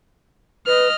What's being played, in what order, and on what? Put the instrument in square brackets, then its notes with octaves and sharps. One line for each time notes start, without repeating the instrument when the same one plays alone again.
[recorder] B4 [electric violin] D#5 F6